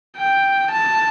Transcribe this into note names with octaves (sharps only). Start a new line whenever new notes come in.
G5
A5